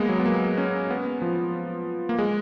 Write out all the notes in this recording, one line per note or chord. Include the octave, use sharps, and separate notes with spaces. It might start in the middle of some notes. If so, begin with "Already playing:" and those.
Already playing: G#3 A#3 B3
F#3
B3
A#3
C#4
B3
F3
A#3
G#3